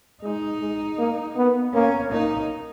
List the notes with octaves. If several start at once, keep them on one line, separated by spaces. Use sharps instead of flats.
G#3 D#4
G#3
A#3
B3
A#3 C#4
A#3 D#4